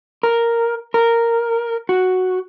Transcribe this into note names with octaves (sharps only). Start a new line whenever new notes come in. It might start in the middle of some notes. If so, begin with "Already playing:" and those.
A#4
A#4
F#4